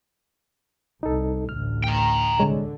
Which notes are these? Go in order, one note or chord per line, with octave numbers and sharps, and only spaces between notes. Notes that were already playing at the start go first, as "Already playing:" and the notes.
C2 D#4 A4
A1 D2 F6
G5 A#5
C2 D3 G#3 C#5